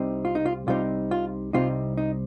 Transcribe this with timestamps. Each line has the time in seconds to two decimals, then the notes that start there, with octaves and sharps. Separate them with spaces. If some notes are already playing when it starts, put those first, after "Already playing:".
Already playing: C2 C3 G3 C4 D#4
0.25 F4
0.35 D#4
0.46 F4
0.67 C2 C3 G3 C4 D#4 F4
1.11 F4
1.53 C2 C3 G3 C4 D#4 F4
1.97 D#4